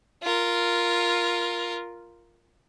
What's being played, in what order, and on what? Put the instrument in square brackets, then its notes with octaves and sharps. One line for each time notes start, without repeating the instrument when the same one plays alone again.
[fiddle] F4 A#4